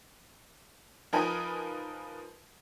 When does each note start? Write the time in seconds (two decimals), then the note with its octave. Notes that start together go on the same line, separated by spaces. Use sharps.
1.13 F3 D#4 A#4 B4 G#5 D#6